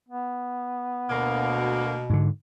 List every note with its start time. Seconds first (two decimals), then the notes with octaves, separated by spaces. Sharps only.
0.09 B3
1.10 D2 B2 A#3
2.10 G#2 D3